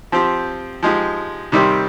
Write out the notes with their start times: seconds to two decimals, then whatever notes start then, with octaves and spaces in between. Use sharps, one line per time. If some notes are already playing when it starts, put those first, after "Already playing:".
0.12 F3 C4 G4
0.83 F3 G#3 D#4 G4
1.52 C3 D#3 G3 C4 G4